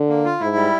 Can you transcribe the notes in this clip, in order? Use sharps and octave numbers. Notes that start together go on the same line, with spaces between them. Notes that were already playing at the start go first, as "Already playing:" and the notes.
Already playing: D3
A#3
F4
G#2 E4
G3